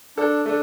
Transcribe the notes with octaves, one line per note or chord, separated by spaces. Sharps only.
D4 A4
A3 D4